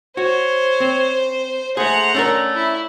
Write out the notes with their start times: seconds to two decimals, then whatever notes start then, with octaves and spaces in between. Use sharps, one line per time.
0.17 F#4 C5 C#5
0.80 C4
1.77 A3 G#4 C5 F#5 A#5
2.15 A3 C#4 D4 A#4
2.55 E4 E5